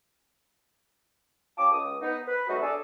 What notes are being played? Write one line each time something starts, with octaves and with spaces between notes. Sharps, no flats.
C#4 F4 G4 A5 D6
C#2 D#6
B3 D#4
B4
F#3 G#3 A3 B3 D#4 F#4
D4 G#4 A4 D5